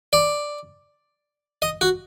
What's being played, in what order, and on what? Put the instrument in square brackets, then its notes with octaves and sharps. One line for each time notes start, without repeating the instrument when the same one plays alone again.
[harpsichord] D5
D#5
F#4